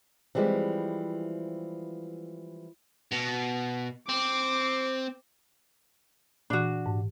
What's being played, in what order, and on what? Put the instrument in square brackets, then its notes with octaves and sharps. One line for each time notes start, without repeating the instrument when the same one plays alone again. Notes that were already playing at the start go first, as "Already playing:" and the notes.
[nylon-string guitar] E3 F3 G3 G#3 C4 G4
[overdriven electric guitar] B2
[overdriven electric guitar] C4 [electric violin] D6
[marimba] A#2 E3 [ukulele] D4 F#4
[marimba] G#2